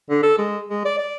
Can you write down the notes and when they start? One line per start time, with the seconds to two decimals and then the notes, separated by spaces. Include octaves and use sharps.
0.10 D3
0.23 A4
0.38 G#3
0.70 G#3
0.85 D5
0.98 D5